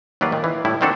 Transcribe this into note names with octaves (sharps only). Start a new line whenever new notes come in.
D#2 F#3 B4 D5 F5
A#2 D#3
E3
A2 G3 E4
D#3 F#3 C4 D4 F#4 A4